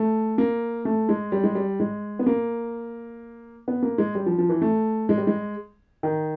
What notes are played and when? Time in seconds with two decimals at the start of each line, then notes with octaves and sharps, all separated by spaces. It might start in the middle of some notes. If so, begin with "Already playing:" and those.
Already playing: A3
0.38 A#3
0.85 A3
1.09 G#3
1.32 G3
1.44 G#3
1.55 G3
1.80 G#3
2.19 B3
2.26 A#3
3.68 B3
3.83 A#3
3.98 G#3
4.15 G3
4.26 F3
4.38 F3
4.49 E3
4.62 A3
5.09 G#3
5.18 G3
5.27 G#3
6.03 D#3